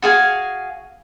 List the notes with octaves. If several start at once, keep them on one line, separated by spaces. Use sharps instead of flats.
F#4 G#4 F5 G#5